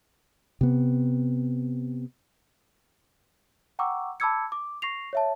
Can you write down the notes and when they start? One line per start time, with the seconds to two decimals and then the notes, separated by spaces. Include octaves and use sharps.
0.61 C3 B3
3.79 F#5 G5 A#5 C#6 D6 E6
4.20 A5 B5 D6 E6 G#6 C#7
4.52 D6
4.82 C#6 A#6 C7 F7
5.13 C#5 E5 A5